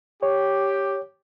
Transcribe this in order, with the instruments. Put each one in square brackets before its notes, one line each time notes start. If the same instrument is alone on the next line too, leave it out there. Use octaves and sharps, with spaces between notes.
[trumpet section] G4 [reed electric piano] C#5